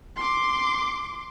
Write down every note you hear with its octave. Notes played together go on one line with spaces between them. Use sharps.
C6 D6